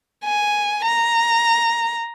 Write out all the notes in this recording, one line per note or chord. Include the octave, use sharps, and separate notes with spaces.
G#5
A#5